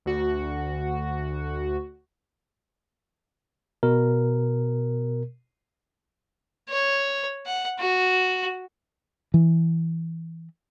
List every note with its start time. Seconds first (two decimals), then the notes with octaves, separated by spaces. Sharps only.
0.06 D2 F#4
3.83 B2 A#4
6.69 C#5
7.46 F#5
7.80 F#4
9.34 E3